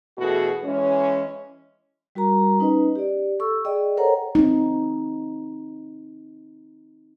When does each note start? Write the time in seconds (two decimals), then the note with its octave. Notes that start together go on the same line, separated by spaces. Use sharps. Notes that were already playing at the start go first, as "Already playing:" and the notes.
0.18 B2 E3 A3 F#4 G#4
0.64 E3 G#3 C#4
2.15 G3 F#4 A#4 A#5
2.59 C#4 D#4 B4 D#5
2.96 G4 D5
3.39 A4 C#6 E6
3.65 G#4 D5 D#5 G5
3.97 A4 A#4 C5 C#5 F#5 A#5
4.35 C4 D#4